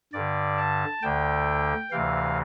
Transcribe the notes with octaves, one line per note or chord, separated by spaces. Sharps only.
G2 D3 D5
A5
D2 D3 G5
D2 C3 E3 F5